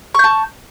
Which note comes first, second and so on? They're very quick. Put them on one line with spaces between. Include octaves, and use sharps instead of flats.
C#6 G6 A5